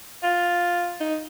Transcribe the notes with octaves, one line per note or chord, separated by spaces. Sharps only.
F4
D#4